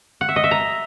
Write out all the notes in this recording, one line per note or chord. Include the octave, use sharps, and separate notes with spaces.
F#5
E5
D#5
E5
A#5